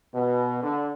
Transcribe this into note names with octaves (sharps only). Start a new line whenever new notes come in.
B2
D3